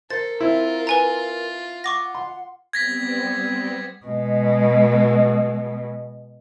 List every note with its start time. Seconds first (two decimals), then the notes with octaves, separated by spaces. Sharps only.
0.10 A4 A#4 C5 A6
0.41 C4 E4 F4
0.87 B4 G#5 A#5
1.84 F#5 C#6 D6 A#6
2.15 C6
2.73 G3 B3 C4 G#6 A#6 B6
4.06 B2 G#3